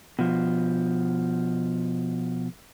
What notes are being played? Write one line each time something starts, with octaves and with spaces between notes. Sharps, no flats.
B2 F3